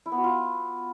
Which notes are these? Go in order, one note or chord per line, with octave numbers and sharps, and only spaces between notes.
E4
B3
F#4
F4